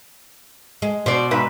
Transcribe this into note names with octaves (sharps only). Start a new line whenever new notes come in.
G#3
B2 C5 D5
G#2 B4 E5